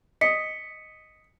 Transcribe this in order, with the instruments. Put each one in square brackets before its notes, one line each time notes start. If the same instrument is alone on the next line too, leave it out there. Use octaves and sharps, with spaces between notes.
[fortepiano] D#5 [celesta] B6 C#7